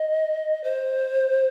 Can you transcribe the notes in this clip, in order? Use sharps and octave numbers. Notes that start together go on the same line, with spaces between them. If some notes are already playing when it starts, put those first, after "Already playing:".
Already playing: D#5
C5